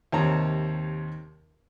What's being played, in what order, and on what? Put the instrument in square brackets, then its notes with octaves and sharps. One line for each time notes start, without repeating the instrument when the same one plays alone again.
[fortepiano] D#2 C3 D#3 C#5 A5 A#5